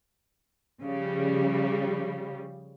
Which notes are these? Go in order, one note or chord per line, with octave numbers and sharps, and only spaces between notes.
C#3 F3 G3